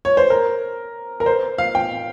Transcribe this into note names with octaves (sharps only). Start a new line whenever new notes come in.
C#5
C5
A#4
A#4
C5
F5
G5